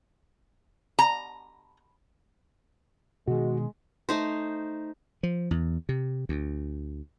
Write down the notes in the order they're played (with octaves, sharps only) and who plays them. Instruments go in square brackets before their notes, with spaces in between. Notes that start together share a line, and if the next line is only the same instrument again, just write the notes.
[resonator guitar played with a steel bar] A#5
[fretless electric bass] B2 D#3 [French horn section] G#3 [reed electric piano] F#4
[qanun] A3 D#4 C5
[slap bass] F3
E2
C3
D2